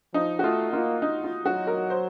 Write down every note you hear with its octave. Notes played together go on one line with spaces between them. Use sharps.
F3 D#4
F#4
A3 F4
A#3 F4
D#4
F4
F#3 F#4
A#4
C5